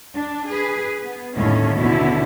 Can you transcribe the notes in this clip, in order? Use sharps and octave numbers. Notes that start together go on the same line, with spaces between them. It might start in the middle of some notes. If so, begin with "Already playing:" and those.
D4
G#4 B4
B3
D#2 A2 D3 C#4 C#5
B2 D3 C#4 E4